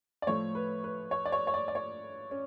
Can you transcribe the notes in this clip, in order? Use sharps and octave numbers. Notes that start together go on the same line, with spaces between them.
D5
A2 F3 A3 C#5
B4
B4
C#5
D5
C#5
C#5
D5
D5
C#5
C#4